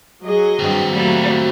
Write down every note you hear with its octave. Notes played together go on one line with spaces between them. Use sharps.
F#3 G#4 D#5
G2 C4 F#4 G4
F#3 G3 A3 A#3